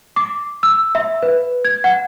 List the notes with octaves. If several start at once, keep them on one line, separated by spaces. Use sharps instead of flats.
D6
E6
E5
B4
G#6
F#5